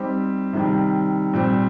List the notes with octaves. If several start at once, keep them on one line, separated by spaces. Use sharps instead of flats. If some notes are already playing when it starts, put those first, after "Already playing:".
Already playing: G3 C4 D#4 G4
C3 D#3 G3
A#2 G3 C4